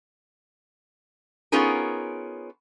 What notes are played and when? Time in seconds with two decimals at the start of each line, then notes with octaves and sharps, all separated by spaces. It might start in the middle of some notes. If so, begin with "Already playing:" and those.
1.52 B3 C#4 D#4 F4 G#4 A#4